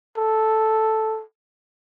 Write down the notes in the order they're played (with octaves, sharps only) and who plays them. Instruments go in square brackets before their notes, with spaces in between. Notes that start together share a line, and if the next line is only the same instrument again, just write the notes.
[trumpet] A4